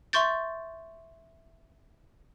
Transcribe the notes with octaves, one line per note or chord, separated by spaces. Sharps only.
E5 C6 C#6 G6 A6